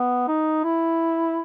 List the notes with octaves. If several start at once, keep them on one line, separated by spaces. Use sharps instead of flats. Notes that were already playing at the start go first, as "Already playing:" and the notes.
Already playing: B3
D#4
E4